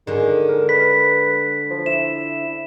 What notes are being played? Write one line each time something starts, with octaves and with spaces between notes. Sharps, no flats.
D3 D#3 G#3
A#4
B4 B6
F3
E4 E7